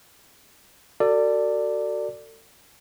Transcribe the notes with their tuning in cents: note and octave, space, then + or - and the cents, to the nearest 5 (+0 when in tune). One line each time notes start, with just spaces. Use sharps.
F#4 +20 A4 +40 D5 +0